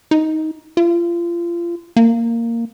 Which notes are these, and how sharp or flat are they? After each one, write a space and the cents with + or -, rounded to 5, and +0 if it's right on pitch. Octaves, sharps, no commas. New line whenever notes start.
D#4 +15
F4 -30
A#3 -10